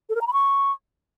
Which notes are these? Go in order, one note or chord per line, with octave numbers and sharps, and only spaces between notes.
A4
A#4
A#5
B5
C#6